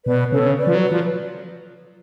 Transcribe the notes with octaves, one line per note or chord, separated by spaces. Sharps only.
B2 B4 D5
C#3 A4 C#5
B2
C#3
B4 D5
F3
F#3
B4 D5
F3